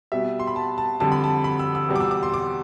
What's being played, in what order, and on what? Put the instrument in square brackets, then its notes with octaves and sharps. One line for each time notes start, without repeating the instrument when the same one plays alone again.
[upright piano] B2 G3 E5
C6
B5
A5
A5
F2 D3 G3 A5
B5
A5
B5
E6
E6
E2 B2 G3
D6
E6
D6
C6
D6